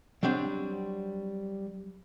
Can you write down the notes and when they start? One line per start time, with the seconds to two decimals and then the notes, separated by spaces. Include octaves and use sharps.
0.23 F#3 G3 C4 D4